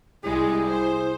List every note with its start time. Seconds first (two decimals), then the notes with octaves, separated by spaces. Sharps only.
0.24 C2 G3 G#3 E4 G#4
0.67 C5